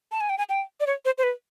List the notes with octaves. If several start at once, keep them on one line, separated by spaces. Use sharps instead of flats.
A5
G#5
G5
G#5
G5
D5
C#5
C5
C5
B4